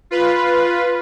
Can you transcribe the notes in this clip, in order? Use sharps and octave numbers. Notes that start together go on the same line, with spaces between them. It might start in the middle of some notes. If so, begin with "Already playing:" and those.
F4 B4